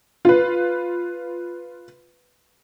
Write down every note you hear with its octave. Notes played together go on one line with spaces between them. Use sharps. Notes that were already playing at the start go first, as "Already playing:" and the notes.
F4 B4